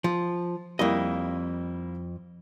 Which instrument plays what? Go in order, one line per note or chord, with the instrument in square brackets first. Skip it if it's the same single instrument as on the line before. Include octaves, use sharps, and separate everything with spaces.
[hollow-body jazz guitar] F3
[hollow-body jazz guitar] F2 D#5 [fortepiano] G3 A#3 E4